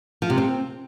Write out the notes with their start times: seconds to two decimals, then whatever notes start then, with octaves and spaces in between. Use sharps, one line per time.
0.22 F3
0.30 C3
0.38 C4